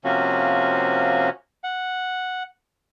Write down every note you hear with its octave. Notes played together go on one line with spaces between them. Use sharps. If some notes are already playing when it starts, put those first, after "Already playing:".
C3 F3 A#3 C#4 F#4
F#5